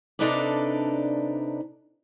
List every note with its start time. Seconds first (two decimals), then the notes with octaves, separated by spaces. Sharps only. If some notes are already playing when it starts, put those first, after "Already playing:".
0.19 C3 D4 D#4 A4 B4 D5